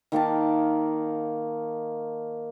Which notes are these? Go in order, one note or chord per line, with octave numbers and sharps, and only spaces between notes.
D#3 A#3 F5 A5